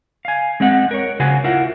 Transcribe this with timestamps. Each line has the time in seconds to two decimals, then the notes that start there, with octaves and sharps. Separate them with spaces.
0.25 F5 G#5
0.60 G#3 C4 D#5 F#5
0.91 A#4 C#5
1.20 C#3 F#4 C5 F#5 G#5
1.44 E4 F4 A#4 F#5